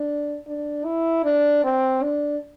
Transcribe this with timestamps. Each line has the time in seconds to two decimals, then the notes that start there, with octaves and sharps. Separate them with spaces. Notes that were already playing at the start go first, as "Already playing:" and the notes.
Already playing: D4
0.47 D4
0.85 E4
1.24 D4
1.64 C4
2.02 D4